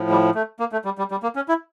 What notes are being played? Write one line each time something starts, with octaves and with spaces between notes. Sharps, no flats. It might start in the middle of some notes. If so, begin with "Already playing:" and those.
Already playing: A2 F3
G3
A3
A#3
A3
G3
G3
G3
A#3
C#4
E4